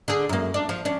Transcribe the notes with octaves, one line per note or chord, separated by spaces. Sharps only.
D3 D4 G#4
F#2 A#3
D4
F3
C#4 D4